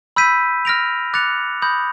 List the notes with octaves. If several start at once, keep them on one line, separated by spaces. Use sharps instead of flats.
B5 E6 G6 B6 D#7
F6 A#6 D7 F7
D6 F#6 A6 C#7 F7
B5 D#6 G6 A#6